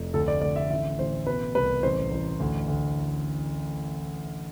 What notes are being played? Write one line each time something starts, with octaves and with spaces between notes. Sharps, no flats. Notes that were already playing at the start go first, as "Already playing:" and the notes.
Already playing: F1
D2 A4
D5
D2 D5
E5
A1 E5
A1 C5
B2 B4
C2 B4
A1 C5
A1
D2
D2